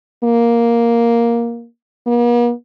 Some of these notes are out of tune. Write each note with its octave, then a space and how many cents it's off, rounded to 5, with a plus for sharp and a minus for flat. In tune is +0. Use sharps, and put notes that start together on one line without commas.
A#3 +5
A#3 +45